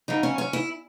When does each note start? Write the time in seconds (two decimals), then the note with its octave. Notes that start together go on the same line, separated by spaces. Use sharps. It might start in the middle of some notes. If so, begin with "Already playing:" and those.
0.08 C#3 F#3 D#4
0.23 C#4
0.38 C#4
0.53 E4